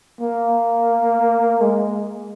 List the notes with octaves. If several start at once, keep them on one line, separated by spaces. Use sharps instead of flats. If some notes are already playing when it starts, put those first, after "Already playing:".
A#3
G#3